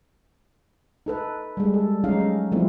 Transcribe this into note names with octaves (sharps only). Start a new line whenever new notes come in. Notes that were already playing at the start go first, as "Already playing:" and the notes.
D#4 A4 B4
G3 G#3
A4
F#3 G#3 C#4 D#4 F5
C#4
F3 G3 A3 B3 C4 E4